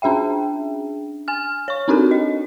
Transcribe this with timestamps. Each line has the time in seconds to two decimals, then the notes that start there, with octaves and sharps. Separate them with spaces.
0.02 C#4 D4 G#4 E5 G5
1.28 G#5 F6
1.68 C#5 C#6
1.88 C4 D4 D#4 F#4 A4 A#4
2.11 D#5